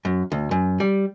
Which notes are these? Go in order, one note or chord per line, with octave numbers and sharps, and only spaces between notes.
F#2
D2
F#2
G3